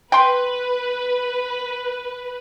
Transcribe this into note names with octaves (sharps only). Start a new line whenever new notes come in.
B4 G5 C6